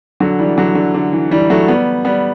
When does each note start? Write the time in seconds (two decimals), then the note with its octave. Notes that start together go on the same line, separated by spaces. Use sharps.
0.20 D3 F#3
0.39 E3 G3
0.58 D3 F#3
0.75 D3
0.94 D3
1.13 E3
1.31 E3 G3
1.50 F#3 A3
1.68 G3 B3
2.05 G3 B3